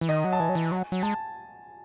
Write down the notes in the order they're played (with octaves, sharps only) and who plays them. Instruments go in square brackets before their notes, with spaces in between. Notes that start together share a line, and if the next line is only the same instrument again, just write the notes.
[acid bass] E3
[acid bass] D#3 [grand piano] D#5
[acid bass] F#3
[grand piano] A5
[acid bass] E3 [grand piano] G#5
[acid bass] F#3
E3
F#3
F#3
[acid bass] G#3 [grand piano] A5